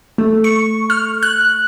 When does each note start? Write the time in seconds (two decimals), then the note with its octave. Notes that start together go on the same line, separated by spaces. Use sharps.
0.18 A3
0.44 C#6
0.90 F6
1.22 F#6